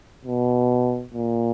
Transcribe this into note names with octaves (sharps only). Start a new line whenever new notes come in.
B2
A#2